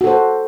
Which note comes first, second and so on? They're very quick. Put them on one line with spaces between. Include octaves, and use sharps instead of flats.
F#4 A4 C5